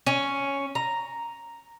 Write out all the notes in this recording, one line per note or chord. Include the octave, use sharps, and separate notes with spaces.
C#4
A#5